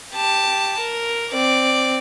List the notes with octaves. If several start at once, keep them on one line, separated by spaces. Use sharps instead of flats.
G4 A5
A#4
C4 D5